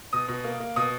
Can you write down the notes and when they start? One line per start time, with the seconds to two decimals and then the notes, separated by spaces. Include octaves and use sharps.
0.13 B2 D#6
0.28 B2
0.44 A#3
0.60 A#3
0.76 B2 D#6